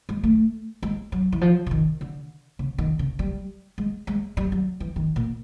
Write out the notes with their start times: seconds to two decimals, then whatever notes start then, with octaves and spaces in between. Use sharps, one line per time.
0.09 G#3
0.23 A3
0.83 G#3
1.12 F#3
1.32 E3
1.41 F3
1.67 D3
1.71 D#3
2.01 D3
2.59 C#3
2.78 D#3
2.99 C#3
3.19 G3
3.78 G#3
4.07 G#3
4.37 G3
4.52 F#3
4.80 E3
4.96 D#3
5.16 A#2